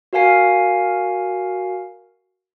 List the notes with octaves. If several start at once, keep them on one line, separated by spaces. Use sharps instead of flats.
F#4 A#4 F5 G#5 C7